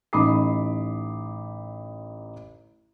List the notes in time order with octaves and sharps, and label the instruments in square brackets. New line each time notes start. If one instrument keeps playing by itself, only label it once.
[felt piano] A1 D#4 B5 D6 D#6 C7